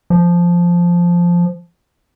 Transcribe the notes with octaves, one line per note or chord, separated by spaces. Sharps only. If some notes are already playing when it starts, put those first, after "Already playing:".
F3